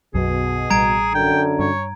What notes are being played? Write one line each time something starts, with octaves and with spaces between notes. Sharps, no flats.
B1 F#2 B2 F#3 G#4
A1 G3 A#5 G#6 D7
F#2 D3 G5
G2 C#5